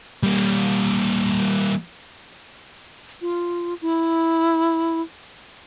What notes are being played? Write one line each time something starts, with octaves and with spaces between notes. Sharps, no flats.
G3 A#3
F4
E4